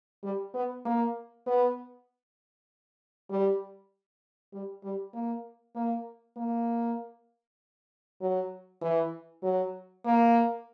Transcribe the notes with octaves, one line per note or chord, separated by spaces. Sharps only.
G3
B3
A#3
B3
G3
G3
G3
A#3
A#3
A#3
F#3
E3
F#3
A#3